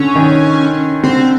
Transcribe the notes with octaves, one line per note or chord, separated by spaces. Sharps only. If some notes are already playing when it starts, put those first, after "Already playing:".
Already playing: D3 C#4
D#3
D3 C4